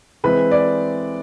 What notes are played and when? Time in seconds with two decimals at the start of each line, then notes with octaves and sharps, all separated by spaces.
0.24 E3 G#3 C4 B4
0.51 D5